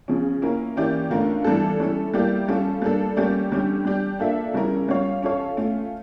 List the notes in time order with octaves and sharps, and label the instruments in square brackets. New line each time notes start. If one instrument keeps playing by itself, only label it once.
[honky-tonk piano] C#3 F3 C#4
A#3 C#4 E4 A#4
E3 A#3 C#4 G4 D5
D3 A3 C#4 F4 A#4
E3 G3 D4 A4
G3 C#4 E4 A4
G3 A#3 E4 G4 D5
G3 C#4 F4 A4
G3 A#3 D4 A4
G3 A#3 C#4 G4 D5
D3 G3 C#4 G4
G3 D4 G4
A#3 D4 F4 A4 E5
C#3 G3 C#4 E4 A#4
G3 C#4 F4 C#5 F5
C#4 F4 A4 C#5 F5
A3 C#4 F4